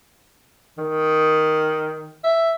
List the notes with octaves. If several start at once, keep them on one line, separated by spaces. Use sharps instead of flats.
D#3
E5